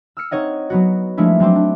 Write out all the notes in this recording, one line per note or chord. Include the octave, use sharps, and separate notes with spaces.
E6 F6 C#7
C4 D#4 C#5 D#5 F#5
F#3 B3 F#4
F3 G#3 A3 D4 E4
F#3 C4 C6 D6
D4